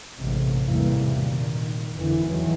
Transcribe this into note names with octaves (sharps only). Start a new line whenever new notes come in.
A1 G#2 C3
E2 A2 C3 E3 G3 A#3
F#1 A#2 D#3
G1 F2 D3 E3
E2 A2 D#3 E3 F#3